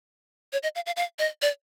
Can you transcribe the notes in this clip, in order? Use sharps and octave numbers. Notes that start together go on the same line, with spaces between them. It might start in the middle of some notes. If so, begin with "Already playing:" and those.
C#5
D#5
F5
F5
F5
D#5
D5